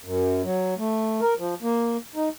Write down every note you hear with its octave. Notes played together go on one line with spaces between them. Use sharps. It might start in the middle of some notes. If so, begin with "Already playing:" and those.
F#2
F#3
A3
A#4
F3
A#3
D#4